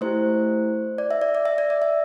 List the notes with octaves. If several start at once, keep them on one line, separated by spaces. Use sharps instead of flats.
A3 E4 G4 C5
D5
E5
D5
D5
E5
D5
D5
E5